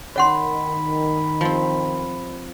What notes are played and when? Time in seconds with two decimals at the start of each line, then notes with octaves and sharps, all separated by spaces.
0.16 D#3 C#5 F#5 B5 C6
1.41 F3 C4